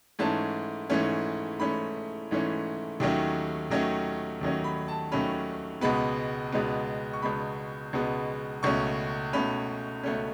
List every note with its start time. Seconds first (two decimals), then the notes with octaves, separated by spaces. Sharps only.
0.19 G#2 E3 A3 C#4 A5
0.90 G#2 E3 A3 C#4
1.60 G#2 E3 A3 C#4 B5
2.31 G#2 E3 A3 C#4
3.00 D#2 D#3 F#3 A3 C#4
3.70 D#2 D#3 F#3 A3 C#4
4.41 D#2 D#3 F#3 A3 C#4
4.64 B5
4.88 A5
5.12 D#2 D#3 F#3 A3 C#4 B5
5.81 C#2 B2 G#3 B3 B5
6.52 C#2 B2 G#3 B3
7.13 C#6
7.22 C#2 B2 G#3 B3 B5
7.93 C#2 B2 G#3 B3
8.63 C#2 B2 A3 C#4 C#6
9.33 C#2 B2 A3 C#4 B5
10.03 C#2 B2 A3 C#4